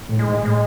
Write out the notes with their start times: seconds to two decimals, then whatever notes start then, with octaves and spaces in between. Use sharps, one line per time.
0.09 A2
0.19 G#3
0.28 G#2
0.44 A2 G#3